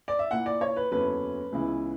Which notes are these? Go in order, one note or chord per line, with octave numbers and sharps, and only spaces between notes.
D5
E5
A#2 A#3 E4 F#5
D5
C#5
B4
F#1 E2 D3 F#3 C#4 B4
C#2 C#3 E3 B3 E4